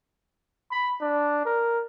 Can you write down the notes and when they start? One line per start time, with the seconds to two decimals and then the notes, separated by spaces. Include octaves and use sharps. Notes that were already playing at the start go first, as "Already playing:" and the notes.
0.71 B5
1.01 D4
1.45 A#4